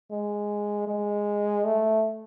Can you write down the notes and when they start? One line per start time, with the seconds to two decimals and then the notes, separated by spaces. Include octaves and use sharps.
0.11 G#3
0.87 G#3
1.65 A3